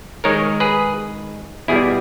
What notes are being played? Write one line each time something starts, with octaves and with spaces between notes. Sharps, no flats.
D#3 G#3 D#4 A#4 C#5
G#4 B4
E2 B2 G3 E4 G#4